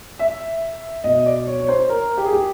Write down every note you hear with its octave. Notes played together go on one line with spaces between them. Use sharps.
E5
B2 D#5
D5
C#5
C#5
C5
A#4
G4
G#4
G4